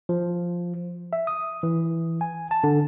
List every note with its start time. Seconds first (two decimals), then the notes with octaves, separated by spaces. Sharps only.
0.09 F3
1.13 E5
1.27 D#6
1.63 E3
2.21 G#5
2.51 A5
2.64 D3